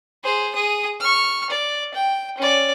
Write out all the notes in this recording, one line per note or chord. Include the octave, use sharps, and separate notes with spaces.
G#4 C5
G#4 D#6
C#6 F6
D5
G5
C#4 D5